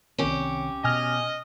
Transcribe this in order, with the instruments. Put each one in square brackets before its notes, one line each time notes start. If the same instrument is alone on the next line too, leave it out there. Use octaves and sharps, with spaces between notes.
[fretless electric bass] C2 D#3 C4 [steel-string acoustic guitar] C#4 G4
[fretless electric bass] B2 [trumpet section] D#5 [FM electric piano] G#5 D#6 F6